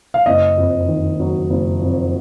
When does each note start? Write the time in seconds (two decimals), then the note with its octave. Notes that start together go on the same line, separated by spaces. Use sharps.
0.14 F5
0.26 F#1 D#5
0.58 F2
0.88 D#3
1.20 F#3
1.50 F#1
1.82 F2